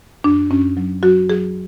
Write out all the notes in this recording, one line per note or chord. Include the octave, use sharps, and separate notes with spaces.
F#2 D4
F#2 C#4
F#3
F#3 F#4
F#3 G#4